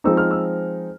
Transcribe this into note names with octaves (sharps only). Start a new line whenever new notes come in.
F3 G#3 C4 D#4 E6
F6
E6